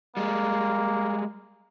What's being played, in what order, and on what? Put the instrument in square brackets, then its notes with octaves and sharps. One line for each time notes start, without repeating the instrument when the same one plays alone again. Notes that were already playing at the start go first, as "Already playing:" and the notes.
[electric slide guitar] G3 G#3 [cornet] A#3